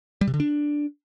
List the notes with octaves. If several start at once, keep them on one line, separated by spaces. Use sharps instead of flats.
G3
C3
D3
D4